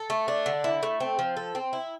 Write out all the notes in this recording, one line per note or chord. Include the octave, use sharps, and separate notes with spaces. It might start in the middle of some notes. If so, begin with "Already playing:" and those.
Already playing: A4
A3
D4
D3
E4
A3
C4
F3
A4
C4
E4